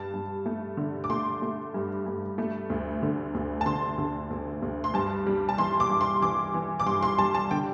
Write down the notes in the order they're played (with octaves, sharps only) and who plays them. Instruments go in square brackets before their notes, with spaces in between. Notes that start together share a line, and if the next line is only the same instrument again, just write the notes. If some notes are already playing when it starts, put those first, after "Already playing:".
Already playing: [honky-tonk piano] G2 A5
G2
A3
D3
D6
A3 C6
A3
G2
G2
A3
D2
D3
D2
A5
D3 C6
D3
D2
D2
C6
G2 A5
G3
A5
E3 C6
D6
G2
C6
E3 D6
E3
D6
G2 C6
C6
G3 A5
A5
D3 G5